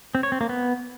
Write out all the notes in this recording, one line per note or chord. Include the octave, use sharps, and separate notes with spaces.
C4
C#5
C4
A#3
B3